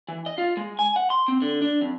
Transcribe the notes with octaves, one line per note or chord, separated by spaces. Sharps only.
E3
D#5
F4
G#3
G#5
F#5
C6
C4
D3
D4
F2